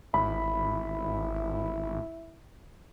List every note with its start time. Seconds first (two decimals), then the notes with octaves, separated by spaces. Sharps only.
0.14 G#1 E4 B5